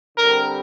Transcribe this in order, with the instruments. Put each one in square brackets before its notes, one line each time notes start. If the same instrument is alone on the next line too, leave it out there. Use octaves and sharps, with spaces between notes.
[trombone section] D3 G3 C4 [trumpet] A#4